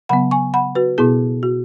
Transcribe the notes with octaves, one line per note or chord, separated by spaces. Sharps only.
C#3 F#3 B3 F#5 B5
G#5 C#6
F#5 B5
F#4 B4
B2 B3 E4 G#4
F#4